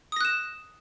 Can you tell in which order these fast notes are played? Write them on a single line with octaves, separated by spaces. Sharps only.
D#6 A#6 F#6 E7